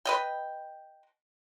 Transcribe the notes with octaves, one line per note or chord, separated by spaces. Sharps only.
B4 D#5 G5